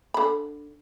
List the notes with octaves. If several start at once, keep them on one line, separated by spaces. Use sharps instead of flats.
D3 B5